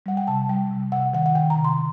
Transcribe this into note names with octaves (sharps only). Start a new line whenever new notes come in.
G3 F#5
G5
C3 A5
G3 G5
C3
C3 F#5
D#3 F#5
F#5
D#3 G5
A#5
C3
C6